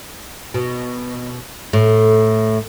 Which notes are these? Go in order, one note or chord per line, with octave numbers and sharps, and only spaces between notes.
B2
A2